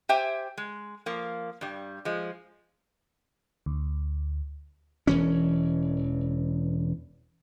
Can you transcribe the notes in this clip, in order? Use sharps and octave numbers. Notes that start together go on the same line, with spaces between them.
G4 C5 E5 G5 G#5
G#3
F3 A#3
G2 G3
F3 G#3
D2
E1 E3 C#4